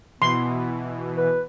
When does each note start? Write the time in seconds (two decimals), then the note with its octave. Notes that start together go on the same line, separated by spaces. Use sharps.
0.22 B2 E3 B3 C6
1.17 B4